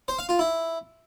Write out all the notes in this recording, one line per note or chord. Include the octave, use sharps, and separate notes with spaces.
C5
F5
F4
E4